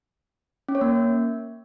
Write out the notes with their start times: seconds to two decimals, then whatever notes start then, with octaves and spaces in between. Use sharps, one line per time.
0.68 C#4
0.75 C#5
0.81 A#3